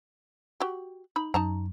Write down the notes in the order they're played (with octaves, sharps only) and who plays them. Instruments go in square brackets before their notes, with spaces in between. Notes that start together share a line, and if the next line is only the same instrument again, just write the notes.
[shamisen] F#4 G4
D#4 B5
[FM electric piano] F#2 [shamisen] D#4 A5 A#5